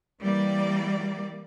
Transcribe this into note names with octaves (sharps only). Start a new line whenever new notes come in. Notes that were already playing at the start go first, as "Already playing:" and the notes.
E3 G3 A#3 D5